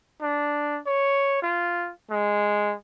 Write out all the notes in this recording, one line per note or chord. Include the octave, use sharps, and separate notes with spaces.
D4
C#5
F4
G#3